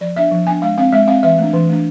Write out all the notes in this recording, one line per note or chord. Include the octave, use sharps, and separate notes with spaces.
F3 D5
B3 D4 E5
F3
B3 D4 G#5
G#3 F5
C4 F5
G#3 E5
C4 F5
E3 E5
A3 D4
E3
A3 D4